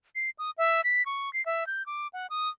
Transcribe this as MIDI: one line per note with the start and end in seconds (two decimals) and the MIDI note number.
0.15 0.30 96
0.38 0.51 87
0.58 0.81 76
0.84 1.05 95
1.06 1.32 85
1.33 1.44 96
1.46 1.66 76
1.67 1.85 91
1.86 2.07 86
2.13 2.27 78
2.30 2.49 87